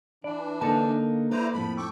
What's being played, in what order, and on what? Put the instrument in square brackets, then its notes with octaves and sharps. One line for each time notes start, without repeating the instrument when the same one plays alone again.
[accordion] E3 D4 [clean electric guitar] D5 [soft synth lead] B5
[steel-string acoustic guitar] D3 D#4 A#4 [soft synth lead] A#3 [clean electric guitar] A4 A5
[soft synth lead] A#3
[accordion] E4 C5 A#5 [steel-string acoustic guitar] B4 D5
[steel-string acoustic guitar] F2 A2 F3 [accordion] B5
[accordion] G5 C#6 D6 [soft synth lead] E6